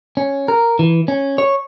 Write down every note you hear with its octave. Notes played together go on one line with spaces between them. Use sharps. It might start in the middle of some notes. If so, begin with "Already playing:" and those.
C#4
A#4
E3
C#4
C#5